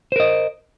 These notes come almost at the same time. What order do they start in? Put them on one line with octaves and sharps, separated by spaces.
C5 A#4 D#5